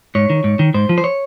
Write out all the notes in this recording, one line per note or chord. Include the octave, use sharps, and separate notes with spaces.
G#2 C#5
D#3
G#2
D#3
G#2 C5
F3
C5
C#5